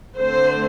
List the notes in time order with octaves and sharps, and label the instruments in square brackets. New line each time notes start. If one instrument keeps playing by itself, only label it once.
[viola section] D3 A3 C4 C5